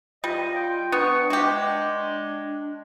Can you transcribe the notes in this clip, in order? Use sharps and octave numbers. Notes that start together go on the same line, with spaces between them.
G3 F4 D#5
G5
B3 D4 C#6
G#3 F#4 G4